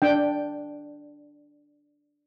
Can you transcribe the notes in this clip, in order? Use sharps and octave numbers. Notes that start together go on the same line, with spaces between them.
D4 G5